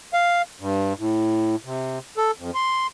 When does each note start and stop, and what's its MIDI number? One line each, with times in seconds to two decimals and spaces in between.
0.13 0.42 77
0.60 0.93 43
0.99 1.56 45
1.65 1.99 48
2.17 2.31 69
2.39 2.51 41
2.55 2.87 84